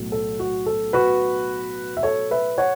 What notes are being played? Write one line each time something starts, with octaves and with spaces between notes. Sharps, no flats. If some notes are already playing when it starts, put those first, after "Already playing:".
Already playing: B1 A2 F#3
A4
F#4
A4
F#4 B4
E5
A4 C#5
B4 E5
C#5 F#5